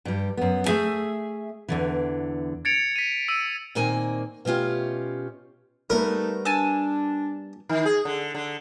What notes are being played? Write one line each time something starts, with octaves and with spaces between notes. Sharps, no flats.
G2 G3
F#2 B3
A3 G#4 E5 G#5
E2 D3 E3
G#6 A6 C#7 D7 F7
B6 D#7
E6 C#7 D#7
A#2 D#3 A#3 C4 G#5
B2 A3 C#4 F4 G4
G3 A3 B3 D#4 A#4 B4
D4 G#5 A5 E6
D#3
G#4
D3
D3